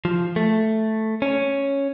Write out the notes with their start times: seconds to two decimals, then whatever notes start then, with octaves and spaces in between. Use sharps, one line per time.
0.05 F3
0.36 A3
1.22 C#4